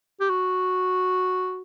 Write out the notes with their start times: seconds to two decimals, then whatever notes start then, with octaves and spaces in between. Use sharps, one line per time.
0.20 G4
0.30 F#4